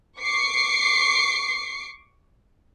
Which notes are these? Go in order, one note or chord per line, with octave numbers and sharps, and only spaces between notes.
C#6 D6 C7 C#7